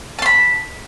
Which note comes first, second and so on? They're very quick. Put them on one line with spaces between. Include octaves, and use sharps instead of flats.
A5 C6 B5